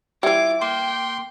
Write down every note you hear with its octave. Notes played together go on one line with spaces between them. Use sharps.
E3 G3 E4 F4 D6
A#3 G5 C6